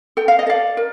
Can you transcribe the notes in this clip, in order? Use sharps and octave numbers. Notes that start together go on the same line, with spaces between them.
A4 G5
F5
D#5
A4 D5 F5
A#4